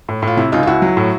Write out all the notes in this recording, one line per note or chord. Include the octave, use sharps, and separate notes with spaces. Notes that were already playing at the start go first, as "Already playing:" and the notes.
A2
A2 F4
C3 E4
C#2 D#4 F4
F4
C#2 E4 F#4
F#3
A2